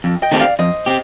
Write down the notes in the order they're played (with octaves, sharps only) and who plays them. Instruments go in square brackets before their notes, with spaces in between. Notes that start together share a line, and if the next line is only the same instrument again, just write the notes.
[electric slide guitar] F2
[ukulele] D#5 G5
[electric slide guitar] D#3 A3 C4 G4
[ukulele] D5 F5
[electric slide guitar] F2 [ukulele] C5 D#5
[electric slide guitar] C4 G4